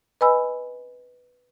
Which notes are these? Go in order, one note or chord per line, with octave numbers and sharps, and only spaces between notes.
B4 D#5 G#5 B5 E6